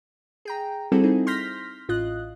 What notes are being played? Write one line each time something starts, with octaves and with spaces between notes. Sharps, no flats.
G#4 G5 A#5
G3 C4 E4 F#4 G#4 A4
C4 D#4 E4 G#4
C6 F6 G6 A#6 B6
A1 F4 D#5 F#6